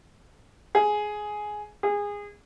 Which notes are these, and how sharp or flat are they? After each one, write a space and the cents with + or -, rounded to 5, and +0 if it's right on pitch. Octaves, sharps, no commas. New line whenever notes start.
G#4 +10
G#4 -20